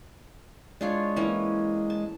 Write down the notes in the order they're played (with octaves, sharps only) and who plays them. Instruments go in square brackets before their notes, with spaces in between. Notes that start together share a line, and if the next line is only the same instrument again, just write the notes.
[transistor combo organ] G#3 [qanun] D4 F4 C#5
[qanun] E3 A#3 C#4
A5